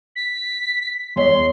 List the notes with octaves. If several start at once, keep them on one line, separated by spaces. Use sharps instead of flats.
B6
E2 C#5 D#5 C6